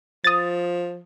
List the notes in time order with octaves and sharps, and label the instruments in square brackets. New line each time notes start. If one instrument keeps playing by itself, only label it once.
[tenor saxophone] F3 [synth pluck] D#6 A6